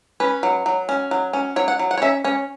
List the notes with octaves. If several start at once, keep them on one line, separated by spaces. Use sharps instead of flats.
C#4 B4
F#3
F#3
C#4
F#3
C#4
F#3 C#5
F#5
F#3
F#5
C#5
C#4 E5
C#4 C#5